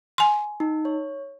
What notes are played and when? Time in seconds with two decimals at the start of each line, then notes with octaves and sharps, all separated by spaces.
0.18 G#5 C6
0.60 D#4
0.85 C#5